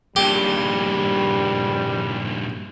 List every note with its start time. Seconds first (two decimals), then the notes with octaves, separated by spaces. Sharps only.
0.16 G2 A#2 G3 G4